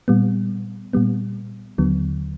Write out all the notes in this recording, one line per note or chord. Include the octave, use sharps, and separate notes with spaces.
A#2 G3 B3
A#2 G3 B3
D#2 D3 F#3 B3